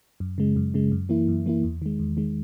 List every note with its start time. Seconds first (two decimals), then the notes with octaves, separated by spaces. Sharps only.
0.20 F#2
0.38 C#3 G#3
0.56 F#2
0.74 C#3 G#3
0.92 F#2
1.09 E3 A#3 E4
1.28 F#2
1.46 E3 A#3 E4
1.63 E2
1.82 D#3 G#3
1.99 E2
2.17 D#3 G#3